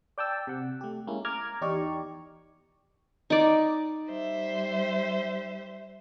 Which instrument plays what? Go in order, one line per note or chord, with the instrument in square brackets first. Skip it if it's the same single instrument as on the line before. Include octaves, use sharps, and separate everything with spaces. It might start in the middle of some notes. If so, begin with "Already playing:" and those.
[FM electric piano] D5 G5 A5 E6
C3 F#5
A3 G4
G#3 A#3 C#4 E4
A#5 D6 F6 G#6
E2 D#4 G4 D5 C#6
[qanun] D#4 D5
[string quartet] G3 C5 E5